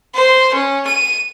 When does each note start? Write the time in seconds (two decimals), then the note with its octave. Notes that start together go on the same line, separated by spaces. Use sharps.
0.15 C5
0.54 C#4
0.87 D#7